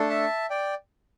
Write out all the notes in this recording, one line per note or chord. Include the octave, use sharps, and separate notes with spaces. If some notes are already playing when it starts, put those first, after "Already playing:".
Already playing: A3 D4 A4
E5 A5
D5 G5